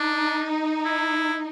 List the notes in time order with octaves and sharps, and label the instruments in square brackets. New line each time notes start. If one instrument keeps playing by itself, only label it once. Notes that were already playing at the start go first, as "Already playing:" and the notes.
Already playing: [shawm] D4 [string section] D#4
[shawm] E4